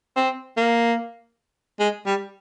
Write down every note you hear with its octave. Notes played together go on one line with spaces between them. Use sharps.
C4
A#3
G#3
G3